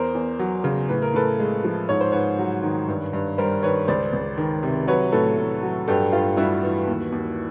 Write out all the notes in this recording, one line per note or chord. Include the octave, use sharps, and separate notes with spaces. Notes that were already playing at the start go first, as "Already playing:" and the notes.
Already playing: E2 A#4 C5
E2
F#3
C#3
A2 B4
A#4
A2 A4 B4
G#3
F3
G#2 C#5
C5
G#2 B4 C#5
F#3
D#3
G2
G2
G3 A#4 C5
D#3 B4 C#5
C#2 C5 D5
C#2
D#3
C3
F#3 B4 C#5
A2 A4 B4
A2
F#3
G2 G4 A4
G2 F4 G4
G3 E4 F#4
E3
D#2
D#2